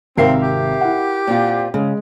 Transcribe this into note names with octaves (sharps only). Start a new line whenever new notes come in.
G#1 C3 C4 A#4 E5 F5 C7
G4
E4 F#5
A#2 C4 F4
C#3 G#3